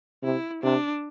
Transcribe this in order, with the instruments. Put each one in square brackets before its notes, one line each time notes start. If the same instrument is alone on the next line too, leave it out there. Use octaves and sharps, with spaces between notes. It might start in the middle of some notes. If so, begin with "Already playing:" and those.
[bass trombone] C3 [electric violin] E4
[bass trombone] C3 [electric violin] D4